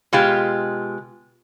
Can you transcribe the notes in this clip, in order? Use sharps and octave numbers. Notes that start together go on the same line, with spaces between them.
B2 G#3 F4 G4